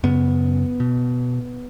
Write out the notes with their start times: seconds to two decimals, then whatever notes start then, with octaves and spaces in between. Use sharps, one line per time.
0.03 F#2 C#3 B3
0.80 B2